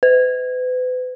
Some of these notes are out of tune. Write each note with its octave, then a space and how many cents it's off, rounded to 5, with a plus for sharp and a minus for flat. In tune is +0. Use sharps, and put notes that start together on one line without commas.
B4 +40